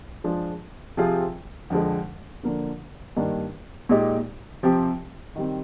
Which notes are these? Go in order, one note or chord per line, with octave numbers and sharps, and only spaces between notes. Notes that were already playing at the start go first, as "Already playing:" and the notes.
F3 G#3 D4 F4 G#4
C3 F3 C4 F4 G#4
F2 D3 F3 G#3
D3 F3 A#3 D4
G2 D#3 A#3 D4
A#2 G#3 D#4 G4
C3 F3 C4 G4
D#3 G3 C4